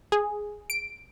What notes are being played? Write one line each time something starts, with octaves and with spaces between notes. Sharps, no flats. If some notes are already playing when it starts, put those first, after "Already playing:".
G#4
D7